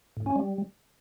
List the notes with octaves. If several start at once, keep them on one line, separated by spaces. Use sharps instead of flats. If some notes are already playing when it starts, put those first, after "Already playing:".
A2
C#4
G3